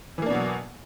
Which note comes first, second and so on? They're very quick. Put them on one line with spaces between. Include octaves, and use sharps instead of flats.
E3 A#3 D4 B2 F#3